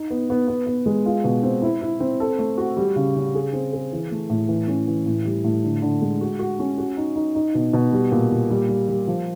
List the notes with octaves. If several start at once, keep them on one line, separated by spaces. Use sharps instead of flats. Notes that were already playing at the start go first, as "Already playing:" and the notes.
Already playing: D#4
B3
B3
B3
B3
G#3
F4
B2
C4
E4
E4
C4
A4
A3
F#4
G3
C#3
C#3
G#4
C4
G#4
E3
A3
A2
E3
C#4
E3
A2
G3
A2
D3
D3
G#3
F#4
F#4
C#4
F#4
D#4
D#4
D#4
B2
B2
G3
A#2
A#2
G3
G3
G3
F3